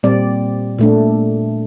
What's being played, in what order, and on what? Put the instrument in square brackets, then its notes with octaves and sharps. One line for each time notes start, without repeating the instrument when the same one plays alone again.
[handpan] A#2 G3 C4 D5
A#2 A3 D4